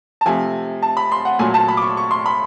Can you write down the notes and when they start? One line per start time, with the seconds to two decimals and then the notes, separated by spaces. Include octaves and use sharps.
0.21 A5
0.26 C3 F3 A3 G#5
0.82 A5
0.97 B5
1.12 C6
1.25 F#5
1.39 A#2 F#3 A3 G#5
1.54 A5
1.68 B5
1.77 D6
1.82 C#6
1.97 C#6
2.11 C6
2.26 B5